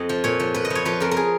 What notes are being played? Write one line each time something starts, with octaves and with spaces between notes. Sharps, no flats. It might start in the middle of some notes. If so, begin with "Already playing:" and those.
Already playing: F2 D#5
F3
A#2 C#5
F3
A#2 B4
D#5
F3
C#5
F3 B4
F2 A#4
A#4
G#4